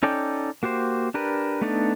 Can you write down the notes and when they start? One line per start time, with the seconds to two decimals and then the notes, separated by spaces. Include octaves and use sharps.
0.03 C#4 D#4 A4 D5 G5
0.63 A#3 F#4 G4 C5
1.14 D4 G4 A#4 B4
1.61 A3 B3 D4 D#4 A4